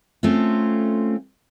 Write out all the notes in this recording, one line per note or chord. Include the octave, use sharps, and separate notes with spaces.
A3 C4 C#4 F4